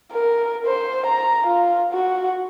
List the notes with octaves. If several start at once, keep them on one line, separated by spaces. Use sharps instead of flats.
A#4
C5
A#5
F4
F#4